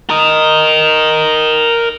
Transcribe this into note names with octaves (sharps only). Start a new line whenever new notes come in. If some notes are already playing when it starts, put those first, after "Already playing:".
A#4 D#5